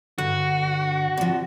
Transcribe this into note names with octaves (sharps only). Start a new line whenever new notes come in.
G2 D3 F#4
C3 F3 G3